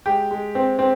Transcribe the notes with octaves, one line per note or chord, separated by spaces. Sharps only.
G#3 G4
G#3
C4
C4